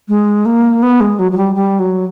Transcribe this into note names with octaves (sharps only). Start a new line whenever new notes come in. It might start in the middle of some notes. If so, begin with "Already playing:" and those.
G#3
A#3
B3
G#3
F#3
F#3
G3
G3
F#3